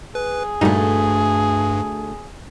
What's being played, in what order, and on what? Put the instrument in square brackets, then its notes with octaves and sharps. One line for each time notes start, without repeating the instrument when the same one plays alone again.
[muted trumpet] G#4 [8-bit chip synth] B4
[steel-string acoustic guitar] D2 A3 [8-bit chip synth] G2 [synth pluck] A#2 G3 D#4